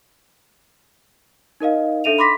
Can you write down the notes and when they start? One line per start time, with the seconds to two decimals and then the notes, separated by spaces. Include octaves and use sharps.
1.60 D#4 A#4 D#5 F5
2.04 D4 A4 E5 D#7 F7
2.18 B5 C6 D6 A#6 B6